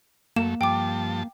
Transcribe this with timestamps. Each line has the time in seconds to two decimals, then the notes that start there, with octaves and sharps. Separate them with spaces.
0.36 F#2 A3 A#3 E7
0.61 G2 F3 G5 A5 D6